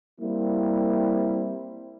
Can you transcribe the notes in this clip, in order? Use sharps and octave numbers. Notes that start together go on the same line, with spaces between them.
G3 A#3 C4 E4